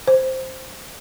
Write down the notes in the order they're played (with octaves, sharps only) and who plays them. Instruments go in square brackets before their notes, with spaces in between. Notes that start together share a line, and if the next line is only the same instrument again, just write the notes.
[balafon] C5